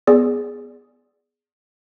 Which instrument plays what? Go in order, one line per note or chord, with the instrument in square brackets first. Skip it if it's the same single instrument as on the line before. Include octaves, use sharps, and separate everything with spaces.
[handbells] B3 G#4 D5